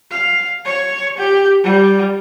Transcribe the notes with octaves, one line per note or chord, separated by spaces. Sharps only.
F5
C#5
G4
G3